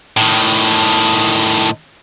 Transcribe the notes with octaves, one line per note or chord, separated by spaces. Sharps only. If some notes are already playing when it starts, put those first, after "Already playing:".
A2 D#3